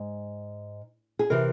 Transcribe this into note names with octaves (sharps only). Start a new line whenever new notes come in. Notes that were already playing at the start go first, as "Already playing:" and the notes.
Already playing: G#2
G#4
C3 E3 A#4